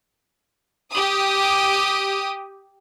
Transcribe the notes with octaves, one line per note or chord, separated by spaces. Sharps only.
G4 D#6